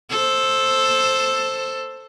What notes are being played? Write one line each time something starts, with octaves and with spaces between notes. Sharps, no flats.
A4 C5